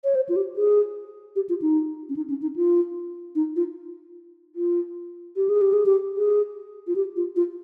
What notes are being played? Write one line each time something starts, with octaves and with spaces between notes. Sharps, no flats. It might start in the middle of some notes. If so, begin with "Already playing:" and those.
C#5
C5
F4
G4
G#4
G4
F4
D#4
C#4
D#4
C#4
D#4
F4
D#4
F4
F4
G4
G#4
G4
G#4
G4
G#4
F4
G4
F4
F4